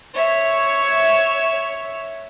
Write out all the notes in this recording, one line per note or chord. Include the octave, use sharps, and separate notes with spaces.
C#5 E5